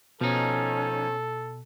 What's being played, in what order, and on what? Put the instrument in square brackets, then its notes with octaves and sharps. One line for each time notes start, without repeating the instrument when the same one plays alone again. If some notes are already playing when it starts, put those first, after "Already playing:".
[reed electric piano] B2 [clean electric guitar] F3 D#4 [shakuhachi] C#4 [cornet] A4